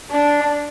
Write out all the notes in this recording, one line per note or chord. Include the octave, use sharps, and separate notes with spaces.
D4